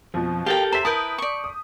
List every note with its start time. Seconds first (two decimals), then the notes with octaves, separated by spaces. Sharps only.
0.14 F2 B2 F3
0.46 G4 A4 A#4 F5 G5
0.72 C5 E5 A#5 B6
0.85 E4 A#4 B4 A5 D#6 G6
1.18 D5 C#6
1.44 D#6